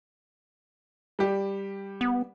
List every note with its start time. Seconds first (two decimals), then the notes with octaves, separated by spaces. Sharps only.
1.19 G3 G4
2.01 B3